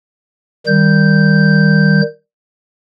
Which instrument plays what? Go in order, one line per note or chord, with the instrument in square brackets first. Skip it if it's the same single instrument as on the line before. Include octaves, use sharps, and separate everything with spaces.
[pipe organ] D#3 G3 G6